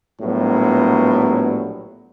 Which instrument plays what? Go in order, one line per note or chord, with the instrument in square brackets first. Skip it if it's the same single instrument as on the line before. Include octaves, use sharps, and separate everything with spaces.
[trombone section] A#1 A2 F#3 G3 B3